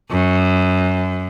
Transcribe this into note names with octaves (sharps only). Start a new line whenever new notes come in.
F#2